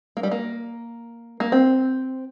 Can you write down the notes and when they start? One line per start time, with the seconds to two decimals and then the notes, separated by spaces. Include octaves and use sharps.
0.17 A#3
0.23 G3
0.31 A#3
1.40 A#3
1.52 C4